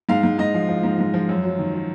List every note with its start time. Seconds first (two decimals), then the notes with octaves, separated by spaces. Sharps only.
0.09 G#2 F5
0.23 G#2
0.38 G#2 D#5
0.54 F3
0.68 F3
0.83 G#2
0.99 G#2
1.14 F3
1.29 F#2
1.44 F#3
1.59 D#3
1.74 F#3